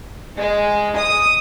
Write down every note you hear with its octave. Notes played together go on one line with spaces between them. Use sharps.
G#3
D#6